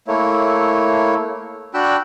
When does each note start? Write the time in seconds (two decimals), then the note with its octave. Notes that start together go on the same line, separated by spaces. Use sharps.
0.08 A3 A#3 E4 C#5
1.74 D4 F#4 G5 B5 E6 F#6